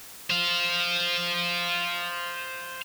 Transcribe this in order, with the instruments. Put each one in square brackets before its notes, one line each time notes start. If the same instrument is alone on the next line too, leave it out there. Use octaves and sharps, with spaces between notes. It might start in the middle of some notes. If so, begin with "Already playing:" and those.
[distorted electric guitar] C5 F5